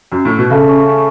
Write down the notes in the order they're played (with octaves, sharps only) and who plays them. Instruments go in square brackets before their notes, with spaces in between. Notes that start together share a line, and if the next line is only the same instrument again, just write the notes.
[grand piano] F#2
A2
B2
[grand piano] C#3 [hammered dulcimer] A3
[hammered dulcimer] C#4
C#4